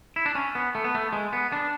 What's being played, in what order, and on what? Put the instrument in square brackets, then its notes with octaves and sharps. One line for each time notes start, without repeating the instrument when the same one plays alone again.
[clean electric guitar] E4
D4
C#4
B3
A3
B3
A3
G#3
B3
D4